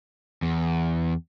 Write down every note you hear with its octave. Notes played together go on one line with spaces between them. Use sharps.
E2